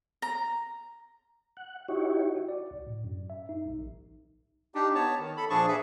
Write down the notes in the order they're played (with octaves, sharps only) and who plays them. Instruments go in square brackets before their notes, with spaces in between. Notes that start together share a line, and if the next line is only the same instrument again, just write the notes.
[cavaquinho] A#5
[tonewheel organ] F#5
D#4 E4 F#4 G4 C#5
[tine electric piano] F#4
D5
C#2
A2
F#2
E5
D#4
B1
A1
[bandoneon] D4 D#4 G4
B3 C#5 A5
D#3
A4 B5
A#2 F3 D4 G#4 A5 C#6
G#4 B4 E5